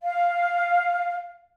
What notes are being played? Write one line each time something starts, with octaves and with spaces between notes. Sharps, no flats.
F5